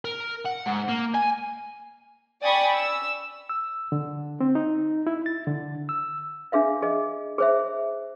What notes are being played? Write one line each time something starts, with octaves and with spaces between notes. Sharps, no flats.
A#4
F#5
G#2
A#3
G#5
D5 G5 G#5 B5 C#6 D#6
E6
E6
D3
C4
D#4
E4
A6
D3
E6
D4 G#4 E5 F5
G#4 D#5
G#4 C5 E5